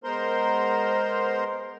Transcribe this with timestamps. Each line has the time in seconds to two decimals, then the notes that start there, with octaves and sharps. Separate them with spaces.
0.04 G#3 B3 A#4 C5 A#5 C6